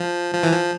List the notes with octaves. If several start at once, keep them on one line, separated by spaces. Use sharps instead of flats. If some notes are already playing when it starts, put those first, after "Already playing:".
Already playing: F3
F3
E3
F3